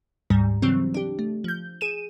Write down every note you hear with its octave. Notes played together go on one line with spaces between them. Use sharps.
D2 G#2 G3 A#5
C#3 E3 F#3 G3 C4
D4 G4
A3
F3 G6
G#4 D#7 E7